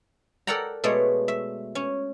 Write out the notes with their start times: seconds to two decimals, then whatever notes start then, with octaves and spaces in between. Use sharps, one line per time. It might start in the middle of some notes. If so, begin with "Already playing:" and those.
0.47 A4 A#4 D5 F#5 G5 A#5
0.84 B2 G#3 A3 C#5 D5
1.28 E5
1.75 C#4